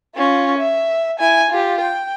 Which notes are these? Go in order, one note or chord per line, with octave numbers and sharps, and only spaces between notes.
C#4 F4
E5
E4 G#5
F4 G4
G5